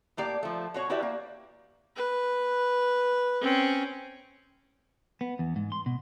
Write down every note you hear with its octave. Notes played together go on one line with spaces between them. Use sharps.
A2 A#3 G4 D5
F3 A3
B2 F#4 C#5
E4 F#4 G4 B4 D5 E5
A#3
B4
C4 C#4
B3
E2
G#2
C6
B2